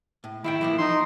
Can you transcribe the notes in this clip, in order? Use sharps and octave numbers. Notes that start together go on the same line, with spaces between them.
A2
D#3 E4 F5 G5
E3 F3 A#3
D#4 C6